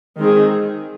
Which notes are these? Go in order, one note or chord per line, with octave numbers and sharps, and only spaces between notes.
D#3 G#3 C4 G#4